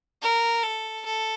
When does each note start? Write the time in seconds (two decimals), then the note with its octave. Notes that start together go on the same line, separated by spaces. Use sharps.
0.22 A#4
0.63 A4
1.06 A4